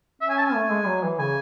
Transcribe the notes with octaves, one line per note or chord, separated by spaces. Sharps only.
C#4 E5
G#5
A5
G#5
A3
G#3
F#3
E3
C#3 G#5